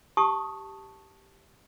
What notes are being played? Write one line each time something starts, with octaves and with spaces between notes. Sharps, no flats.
G4 A5 C#6 D#6